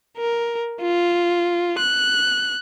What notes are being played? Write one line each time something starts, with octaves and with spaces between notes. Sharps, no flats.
A#4
F4
F#6